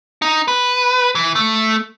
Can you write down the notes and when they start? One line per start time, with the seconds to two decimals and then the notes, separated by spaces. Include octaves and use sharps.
0.22 D#4
0.48 B4
1.15 E3
1.36 A3